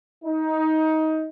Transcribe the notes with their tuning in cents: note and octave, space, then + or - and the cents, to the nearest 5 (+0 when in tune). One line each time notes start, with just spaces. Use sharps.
D#4 +20